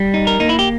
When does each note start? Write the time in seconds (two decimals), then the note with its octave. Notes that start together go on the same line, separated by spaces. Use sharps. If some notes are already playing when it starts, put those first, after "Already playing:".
Already playing: G3
0.14 D#4
0.27 A#4
0.40 A#3 D#4
0.49 E4
0.59 G4